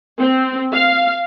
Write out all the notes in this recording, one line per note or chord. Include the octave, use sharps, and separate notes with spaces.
C4
F5